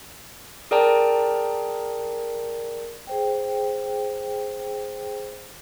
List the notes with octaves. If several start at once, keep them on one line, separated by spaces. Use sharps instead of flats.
G#4 A#4 D5 G5 A5 A#5
G#4 C5 G5